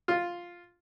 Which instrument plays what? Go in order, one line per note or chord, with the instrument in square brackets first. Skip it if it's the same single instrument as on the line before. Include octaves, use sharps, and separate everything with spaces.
[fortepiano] F4